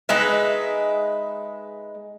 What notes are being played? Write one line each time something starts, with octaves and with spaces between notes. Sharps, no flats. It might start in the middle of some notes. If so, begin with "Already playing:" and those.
G#3 D#4 B4 E5